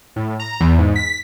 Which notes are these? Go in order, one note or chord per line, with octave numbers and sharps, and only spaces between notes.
A2
A#5
E2
G#2
B6